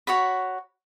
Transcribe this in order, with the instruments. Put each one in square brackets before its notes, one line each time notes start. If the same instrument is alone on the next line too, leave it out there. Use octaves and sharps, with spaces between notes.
[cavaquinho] F#4 C#5 F#5 B5